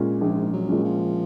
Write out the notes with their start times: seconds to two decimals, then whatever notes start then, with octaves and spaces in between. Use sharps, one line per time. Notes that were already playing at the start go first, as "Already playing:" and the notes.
Already playing: A#2 G#3 C#4
0.21 A#1 G#2
0.53 F#3
0.68 A#2 G#3 C#4
0.84 F3